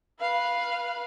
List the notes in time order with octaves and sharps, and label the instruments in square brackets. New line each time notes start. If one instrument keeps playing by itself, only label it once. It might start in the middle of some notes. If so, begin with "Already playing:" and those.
[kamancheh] B4 F5